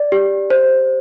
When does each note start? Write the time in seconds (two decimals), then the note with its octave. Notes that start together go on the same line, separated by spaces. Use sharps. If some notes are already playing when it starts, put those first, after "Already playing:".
Already playing: D5
0.12 G4
0.50 C5